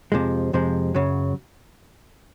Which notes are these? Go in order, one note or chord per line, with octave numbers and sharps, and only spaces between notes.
F2 C3 F3 G#3
F2 C3 F3 G#3
F#2 C#3 F#3